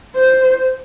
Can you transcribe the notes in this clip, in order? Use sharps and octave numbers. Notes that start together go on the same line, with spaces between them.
C5